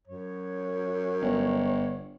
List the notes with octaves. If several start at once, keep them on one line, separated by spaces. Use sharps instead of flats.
F#2 C#5
G1